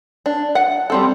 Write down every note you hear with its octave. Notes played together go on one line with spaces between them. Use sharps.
D4
F#5
G3 C4 A4